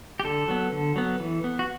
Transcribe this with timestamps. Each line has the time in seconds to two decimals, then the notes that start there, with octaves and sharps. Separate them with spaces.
0.20 G4
0.24 D3 A4
0.48 F#3 B3
0.72 D3
0.96 F#3 B3
1.20 E3
1.44 B3
1.59 F#4